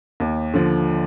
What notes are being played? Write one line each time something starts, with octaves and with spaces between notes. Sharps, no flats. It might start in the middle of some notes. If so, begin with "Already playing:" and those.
D#2
D3 F3